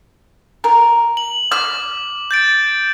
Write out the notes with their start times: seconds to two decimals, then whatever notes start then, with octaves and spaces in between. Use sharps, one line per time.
0.64 A#4
1.17 F#7
1.52 D6 F6
2.31 G6 A6 D7